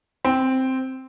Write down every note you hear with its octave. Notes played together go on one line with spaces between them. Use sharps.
C4